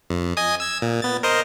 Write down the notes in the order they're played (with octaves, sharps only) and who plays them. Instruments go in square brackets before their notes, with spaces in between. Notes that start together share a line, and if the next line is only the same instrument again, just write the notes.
[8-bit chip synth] F2
D#5 G#5 D#6
E6 G#6
A#2
B3 A6
A#4 C5 D#5